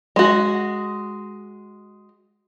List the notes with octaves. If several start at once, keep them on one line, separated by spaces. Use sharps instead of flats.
G#3 F#4